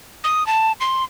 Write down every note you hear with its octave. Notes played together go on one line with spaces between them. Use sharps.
D#6
A5
C6